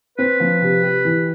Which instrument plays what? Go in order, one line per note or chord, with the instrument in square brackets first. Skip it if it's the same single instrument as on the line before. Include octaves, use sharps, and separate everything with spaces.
[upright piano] C4 [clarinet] B4
[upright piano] F3
C3
G4
E3